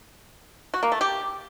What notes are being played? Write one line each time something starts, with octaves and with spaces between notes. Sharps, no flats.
F#4
A#3
A3
G4